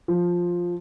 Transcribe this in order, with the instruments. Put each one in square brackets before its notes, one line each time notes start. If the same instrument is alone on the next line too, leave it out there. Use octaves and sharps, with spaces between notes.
[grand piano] F3